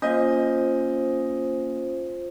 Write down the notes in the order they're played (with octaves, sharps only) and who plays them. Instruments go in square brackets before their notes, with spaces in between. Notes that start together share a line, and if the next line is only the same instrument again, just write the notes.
[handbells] A#3 C#4 [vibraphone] F4 C5 [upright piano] D#5